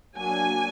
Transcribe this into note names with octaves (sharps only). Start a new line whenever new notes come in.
F#3 A#3 D4 G#5